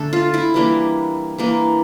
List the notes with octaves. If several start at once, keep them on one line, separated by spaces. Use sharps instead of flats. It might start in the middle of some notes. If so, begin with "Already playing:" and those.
Already playing: D3 A3 D4 A4
F4
E4
E3 G3 A#3 D4
E3 A#3 D4